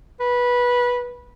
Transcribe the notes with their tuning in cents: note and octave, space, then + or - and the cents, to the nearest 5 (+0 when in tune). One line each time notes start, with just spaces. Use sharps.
B4 -15